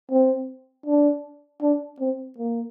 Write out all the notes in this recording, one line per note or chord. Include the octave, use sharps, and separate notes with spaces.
C4
D4
D4
C4
A#3